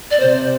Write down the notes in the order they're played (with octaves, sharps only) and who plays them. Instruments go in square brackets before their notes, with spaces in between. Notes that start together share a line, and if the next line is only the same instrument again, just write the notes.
[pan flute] D5
[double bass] C3 [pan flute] C5